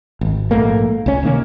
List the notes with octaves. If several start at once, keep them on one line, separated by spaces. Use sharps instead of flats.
G#1
A#1 G#2 A3 A#3
C#2 C#4
C3 D#3 A#3 C#4